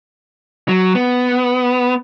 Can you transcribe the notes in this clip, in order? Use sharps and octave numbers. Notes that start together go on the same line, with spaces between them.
F#3
B3